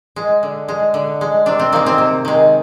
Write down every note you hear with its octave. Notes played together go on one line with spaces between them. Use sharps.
G#3
D3
G#3
D3
G#3
C3 D4
C4
D#3 G#3 A#3
C4
C3
D#3 G#3